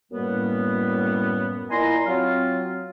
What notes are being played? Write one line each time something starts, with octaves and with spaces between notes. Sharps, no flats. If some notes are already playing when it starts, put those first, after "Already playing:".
F#2 A2 G3 A#3 B3
A#2 E4 D#5 G#5 A#5 C6
F#3 C4 F4